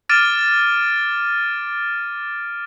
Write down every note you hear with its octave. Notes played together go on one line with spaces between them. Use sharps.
D6 F6 A6 D7 D#7